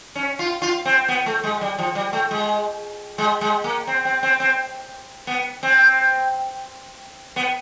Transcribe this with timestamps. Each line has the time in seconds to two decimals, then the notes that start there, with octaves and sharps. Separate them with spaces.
0.15 C#4
0.39 F4
0.62 F4
0.85 C4
1.08 B3
1.26 A3
1.43 G#3
1.61 G3
1.78 F3
1.95 G3
2.13 A3
2.31 G#3
3.18 G#3
3.41 G#3
3.64 A#3
3.87 C4
4.05 C4
4.23 C4
4.40 C4
5.27 B3
5.63 C4
7.36 B3